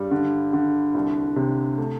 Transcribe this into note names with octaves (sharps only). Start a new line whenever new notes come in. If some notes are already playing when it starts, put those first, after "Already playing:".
Already playing: G2 G3
D3
D3
C2
C3
A3